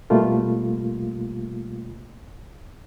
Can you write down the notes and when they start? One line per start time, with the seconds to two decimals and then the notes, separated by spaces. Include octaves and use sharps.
0.10 B2 G3 A3 A#3 F4